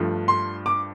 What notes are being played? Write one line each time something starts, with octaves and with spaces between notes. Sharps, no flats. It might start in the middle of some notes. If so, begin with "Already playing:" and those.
Already playing: G2 F3 A3
C6
D6